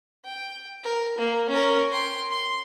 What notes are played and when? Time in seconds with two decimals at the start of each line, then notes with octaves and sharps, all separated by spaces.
0.25 G5
0.83 A#4
1.18 A#3
1.50 C#4 A#4
1.90 G5 C6
2.31 C6